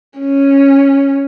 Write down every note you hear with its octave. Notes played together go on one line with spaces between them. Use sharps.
C#4